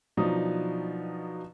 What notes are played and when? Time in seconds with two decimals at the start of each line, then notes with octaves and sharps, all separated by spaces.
0.17 B2 F3 F#3 D4 D#4 D#6